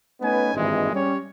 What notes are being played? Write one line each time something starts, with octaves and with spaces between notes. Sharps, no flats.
A3 B3 C#4 D#4 B4 G#5
G#1 G2 A#2 D#3 E3 G#3
G3 C#4 C#5